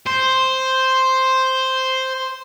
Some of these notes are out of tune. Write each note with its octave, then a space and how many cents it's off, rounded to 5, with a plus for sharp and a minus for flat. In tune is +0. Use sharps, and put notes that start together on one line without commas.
C5 +0